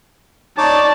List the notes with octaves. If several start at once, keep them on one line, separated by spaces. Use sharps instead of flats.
D#4 C#5 D5 A5 D6